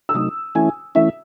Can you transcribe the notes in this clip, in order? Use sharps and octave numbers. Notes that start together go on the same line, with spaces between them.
E6
C3 F#3 A3 D#4 D#6
E3 A3 C#4 E4 G#5
E3 A3 C#4 E4 E5